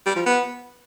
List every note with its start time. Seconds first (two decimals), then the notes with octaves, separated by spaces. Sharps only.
0.06 G3
0.16 F3
0.26 B3